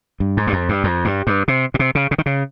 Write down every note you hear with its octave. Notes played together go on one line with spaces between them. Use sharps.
G2
G#2
G2
F2
G2
F2
G2
G2
C3
A#2
C3
C#3
C#3
D#3
C#3